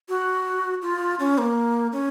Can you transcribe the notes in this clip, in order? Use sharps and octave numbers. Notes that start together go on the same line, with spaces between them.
F#4
F4
C#4
A#3
C#4